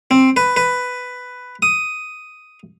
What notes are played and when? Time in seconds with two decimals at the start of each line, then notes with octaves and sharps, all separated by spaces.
0.11 C4
0.36 B4
0.56 B4
1.62 D#6